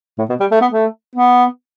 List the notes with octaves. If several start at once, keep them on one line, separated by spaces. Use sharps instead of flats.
A2
B2
G3
A3
B3
A3
B3